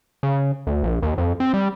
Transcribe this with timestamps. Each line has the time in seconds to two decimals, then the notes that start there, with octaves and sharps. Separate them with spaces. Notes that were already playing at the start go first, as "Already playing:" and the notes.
0.23 C#3
0.67 D2
0.84 A#1
1.03 D#2
1.18 F2
1.40 C4
1.54 G3